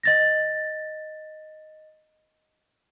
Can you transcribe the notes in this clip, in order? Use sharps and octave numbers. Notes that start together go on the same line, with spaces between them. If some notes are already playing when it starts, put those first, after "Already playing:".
D#5 A6 A#6